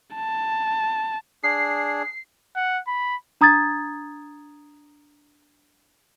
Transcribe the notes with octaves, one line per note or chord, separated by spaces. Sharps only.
A5
D4 G#4 C7
F#5
B5
D4 A#5 D#6 G#6 A6